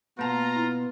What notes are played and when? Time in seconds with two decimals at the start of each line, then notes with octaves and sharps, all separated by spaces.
0.19 B2 A#3 B3 F4 A5 A#5
0.56 E4